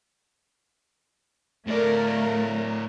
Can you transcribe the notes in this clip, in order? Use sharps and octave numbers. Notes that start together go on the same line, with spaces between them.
A2 A3 A#4 D5